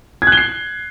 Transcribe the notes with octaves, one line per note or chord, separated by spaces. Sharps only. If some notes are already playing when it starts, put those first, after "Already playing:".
G#6
F#6
G7
C7